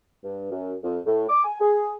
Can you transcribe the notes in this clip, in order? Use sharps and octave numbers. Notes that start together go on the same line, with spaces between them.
G2
F#2
F2
A2
D6
G#5
G#4